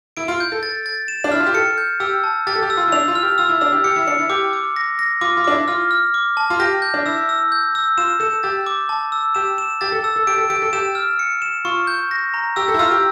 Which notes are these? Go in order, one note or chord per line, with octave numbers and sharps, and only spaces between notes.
E4 D7
F4
G6
A4
A6
A6
E7
D4
E4 F6
F4
G4
A4 C#7
G6
G4 E6
A5
G4 A6
A4
G4
E6
F4
E4
D4 F7
F4
F6
G4
F4 E6
E4
D4 E6
G4
G4 C#7
E4
D4 C#7
E4
G4 D6
D6
A#6
A#6
F4 D6
F4
D4 D6
E4
F4 F6
F6
D6
A5
F4
G4 A#6
G6
D4
E4 E6
E6
G6
E6
F4 E7
A4 E7
G4 A6
D6
A5
E6
G4 E7
E7
G4 A6
A4
E6
A4
G4 D7
A4
G4 D7
A4
G4 E7
F6
C#7
E7
F4 C#6
G6
A#6
A#5
G4 E6
A4
E4
F4 E6
G4